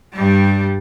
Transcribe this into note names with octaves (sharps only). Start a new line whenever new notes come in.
G2 G3